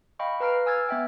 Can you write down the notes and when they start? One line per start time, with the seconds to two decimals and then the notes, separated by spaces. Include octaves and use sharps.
0.19 D#5 F5 G5 B5 C#6
0.40 B4 F5 A#5 F6 C7 D7
0.66 G#5 E6 F6 G#6 A6
0.89 B3 E5 G5